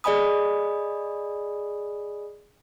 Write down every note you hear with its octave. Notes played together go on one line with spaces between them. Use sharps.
G#4 D5 D#5 G#5 B5 D#6